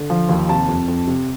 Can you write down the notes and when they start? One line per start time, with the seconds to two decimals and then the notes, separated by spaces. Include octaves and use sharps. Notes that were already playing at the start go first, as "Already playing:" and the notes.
Already playing: D3
0.10 F3
0.29 D#2
0.49 C3 A5
0.68 F2
0.88 F2
1.07 C3